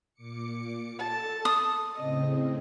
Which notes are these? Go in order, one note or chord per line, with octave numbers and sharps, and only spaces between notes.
A#2 D6 C#7
A4 A5
D#6
A2 C#3 C4 D#5